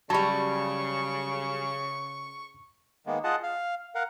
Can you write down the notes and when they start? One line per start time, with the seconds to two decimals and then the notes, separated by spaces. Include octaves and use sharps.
0.10 C#3 F#3 G3 A5 B5 C#6
3.06 D#3 G#3 A#3 B3
3.24 F4 G#4 D#5 F#5 A5
3.43 F5 F6
3.95 A#4 F5 F#5